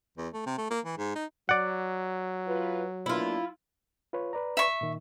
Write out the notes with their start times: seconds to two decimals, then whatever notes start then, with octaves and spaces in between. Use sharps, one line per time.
0.18 E2
0.34 A3
0.46 C3
0.58 A3
0.70 A#3
0.85 E3
0.98 G#2
1.16 D#4
1.49 F#3 D5 F#5
2.47 F4 B4
3.06 A#3 B3 D4 E4 F4
4.13 F4 B4 C#5
4.33 B4 D5 A#5
4.57 E5 C#6
4.81 A#2 D#3